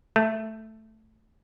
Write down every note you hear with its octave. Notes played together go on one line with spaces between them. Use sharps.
A3